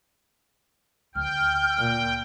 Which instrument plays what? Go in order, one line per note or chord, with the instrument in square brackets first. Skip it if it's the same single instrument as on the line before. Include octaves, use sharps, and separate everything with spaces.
[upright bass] D2 [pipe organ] G5 [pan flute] F6
[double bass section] A#2